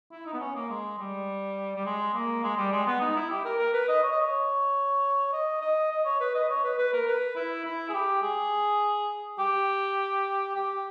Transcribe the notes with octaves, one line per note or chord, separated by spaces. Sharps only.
E4
D#4
B3
C#4
A#3
G#3
G3
G3
G#3
A#3
G#3
G3
G#3
B3
D#4
E4
G4
A#4
A#4
B4
D#5
C#5
D#5
C#5
D#5
D#5
D#5
C#5
B4
D#5
C#5
B4
B4
A#4
B4
E4
E4
G#4
G4
G#4
G4
G4